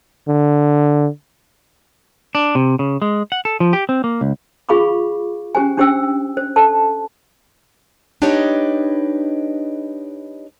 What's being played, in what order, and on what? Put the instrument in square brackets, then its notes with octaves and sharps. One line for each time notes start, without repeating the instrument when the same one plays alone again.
[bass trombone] D3
[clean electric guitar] D4
C3
C#3
G#3
F#5
A4
F3
G4
C4
A#3
C#2
[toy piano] F4 G#4 F5 B5 C#6 D6
C#4 G4 C5 G#5
C#4 D4 G4 C5 G5 E6
C5
A4 C5 A5
[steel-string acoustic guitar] D4 D#4 G4 B4 C#5 D#5